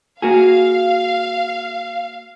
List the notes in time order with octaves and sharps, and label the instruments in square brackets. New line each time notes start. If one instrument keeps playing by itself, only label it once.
[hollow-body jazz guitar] A#3 F#4 G#4 [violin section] F5